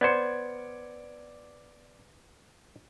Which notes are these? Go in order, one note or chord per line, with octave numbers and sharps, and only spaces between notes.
B3 C5 D5 G#6 C#7